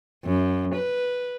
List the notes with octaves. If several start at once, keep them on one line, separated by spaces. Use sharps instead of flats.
F#2
B4